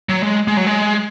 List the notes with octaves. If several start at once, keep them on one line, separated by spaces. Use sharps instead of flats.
F#3
G#3
G#3
F#3
G#3